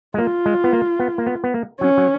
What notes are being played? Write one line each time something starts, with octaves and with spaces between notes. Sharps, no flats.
G#3
A#3 F4
G#3
B3
A#3
B3
A#3
B3
B3
A#3
F#3 C#4
F#3